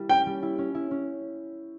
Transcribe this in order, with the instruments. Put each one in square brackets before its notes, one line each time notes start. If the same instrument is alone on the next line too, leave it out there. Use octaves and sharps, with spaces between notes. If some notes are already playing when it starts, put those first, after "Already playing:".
Already playing: [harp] G3 A#3 E4
[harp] C#4 [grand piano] G5
[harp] G3
E4
C#4
E4
C#4